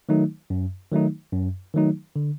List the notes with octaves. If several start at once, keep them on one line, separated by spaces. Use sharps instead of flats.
D#3 F#3 A3 D#4
F#2
D#3 F#3 A3 D#4
F#2
D#3 F#3 A3 D#4
D3